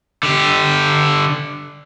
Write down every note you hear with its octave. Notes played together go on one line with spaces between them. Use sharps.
D3 G4